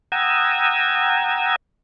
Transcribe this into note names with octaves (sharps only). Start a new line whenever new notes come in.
F#5 G5 A#5 D#6 E6 G#6